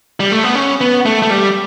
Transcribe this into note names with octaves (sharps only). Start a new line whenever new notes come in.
G3
A3
B3
C#4
B3
A3
A3
G3